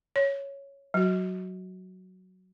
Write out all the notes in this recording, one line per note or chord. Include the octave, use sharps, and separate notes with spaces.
C#5
F#3 F#4